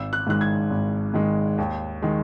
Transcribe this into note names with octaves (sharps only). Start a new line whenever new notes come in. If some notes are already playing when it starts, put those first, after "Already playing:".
Already playing: G#1 E6
F#6
G#2 D#3 G#3 F#6
G#6
G#1
G#2 D#3 G#3
D#2
D#3 G#3